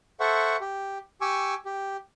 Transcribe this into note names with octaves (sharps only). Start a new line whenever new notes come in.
A4 C5 E5 F#5 C#6
G4
G4 G#5 C#6 D6 E6
G4